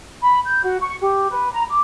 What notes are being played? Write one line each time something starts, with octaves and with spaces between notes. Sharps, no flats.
B5
G6
F#4
C#6
G4
B4
A#5
D6